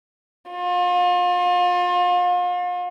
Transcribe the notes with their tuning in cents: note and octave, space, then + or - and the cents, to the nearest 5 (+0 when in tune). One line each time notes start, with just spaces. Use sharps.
F4 +35